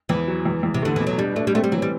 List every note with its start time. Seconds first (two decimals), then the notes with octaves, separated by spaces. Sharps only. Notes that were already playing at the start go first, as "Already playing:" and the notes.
0.09 E2 E3
0.28 F#3
0.45 E2
0.63 E2
0.74 C3
0.82 D3 A3
0.96 B2 E3
1.07 F#3
1.18 G3 D4
1.36 A3 D4
1.47 G3
1.54 A3 C4
1.64 G3
1.72 E3 F#3
1.82 G3